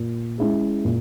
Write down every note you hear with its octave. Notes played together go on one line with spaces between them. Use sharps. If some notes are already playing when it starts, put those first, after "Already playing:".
Already playing: A#2
G#3 C#4 E4 G#4
A#2